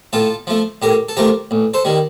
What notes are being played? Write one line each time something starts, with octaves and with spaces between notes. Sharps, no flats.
A2 F4 A4
F3 A3
A2 G4 A#4
A4
F3 A3 G4 A#4
A1
A4 C5
D#3 G3